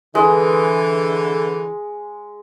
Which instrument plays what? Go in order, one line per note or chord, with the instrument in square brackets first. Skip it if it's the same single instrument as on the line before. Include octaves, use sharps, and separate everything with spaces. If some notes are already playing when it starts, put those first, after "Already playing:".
[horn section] D3 E3 [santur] G#3